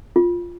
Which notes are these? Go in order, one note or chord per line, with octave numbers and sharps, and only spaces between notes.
F4